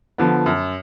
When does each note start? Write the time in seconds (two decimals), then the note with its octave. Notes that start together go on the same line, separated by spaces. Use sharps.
0.18 D3 F3 B3
0.46 F#2